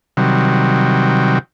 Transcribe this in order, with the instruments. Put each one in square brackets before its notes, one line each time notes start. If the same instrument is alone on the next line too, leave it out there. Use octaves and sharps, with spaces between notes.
[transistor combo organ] C3 D#3 F#3 G3